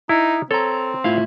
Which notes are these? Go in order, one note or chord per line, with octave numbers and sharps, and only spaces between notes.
D#4 E4
C4 A4 C#5 A#5
A2 E4 F4 F5